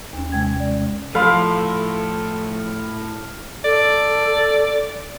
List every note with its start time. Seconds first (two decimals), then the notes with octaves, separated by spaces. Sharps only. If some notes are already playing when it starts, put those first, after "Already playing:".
0.13 D#2 C#4
0.32 C3 G#3 G5 G#6
0.60 D5
1.15 A2 F3 A4 F5 B5 C6 E6
3.65 A4 D5